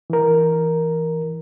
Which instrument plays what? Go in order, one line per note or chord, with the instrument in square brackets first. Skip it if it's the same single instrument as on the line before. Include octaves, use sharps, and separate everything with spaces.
[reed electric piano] E3 A#4